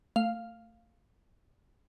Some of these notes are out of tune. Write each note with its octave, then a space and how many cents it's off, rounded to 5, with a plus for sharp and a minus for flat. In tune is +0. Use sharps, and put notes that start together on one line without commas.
A3 +25 F5 +0